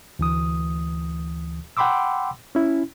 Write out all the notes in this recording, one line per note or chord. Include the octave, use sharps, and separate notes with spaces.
D2 E3 D#6
F#5 G5 B5 C6 D6 E6
C#4 E4